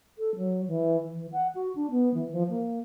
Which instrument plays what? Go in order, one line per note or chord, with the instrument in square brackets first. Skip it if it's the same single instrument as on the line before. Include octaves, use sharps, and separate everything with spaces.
[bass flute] A4
F#3
E3
E3
F#5
F#4
D4
B3
E3
F3
A#3